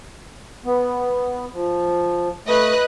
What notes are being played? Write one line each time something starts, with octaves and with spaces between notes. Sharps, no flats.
B3
F3
A3 B4 D#5 F#6